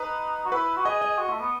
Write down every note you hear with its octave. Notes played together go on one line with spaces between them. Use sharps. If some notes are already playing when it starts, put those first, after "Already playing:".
Already playing: D#4 B4
F#4
E4 B4
F#4
G#4 D#5
D#5
F#4
A3
B3